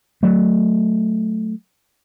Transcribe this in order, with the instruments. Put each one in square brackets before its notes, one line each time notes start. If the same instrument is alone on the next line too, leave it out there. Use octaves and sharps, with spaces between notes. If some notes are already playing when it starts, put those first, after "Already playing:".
[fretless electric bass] F#3 A3